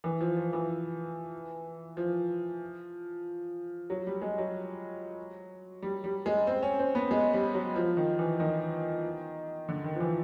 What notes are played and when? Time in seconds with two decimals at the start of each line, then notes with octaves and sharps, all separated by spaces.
0.04 E3
0.21 F3
0.37 F3
0.53 E3
1.97 F3
3.90 F#3
4.07 G3
4.22 G#3
4.38 F#3
5.82 G3
6.04 G3
6.26 G#3
6.47 C4
6.63 C#4
6.79 C4
6.95 B3
7.11 G#3
7.33 G3
7.54 F#3
7.76 F3
7.97 D#3
8.19 E3
8.40 D#3
9.69 D3
9.84 D#3
9.95 F3
10.00 E3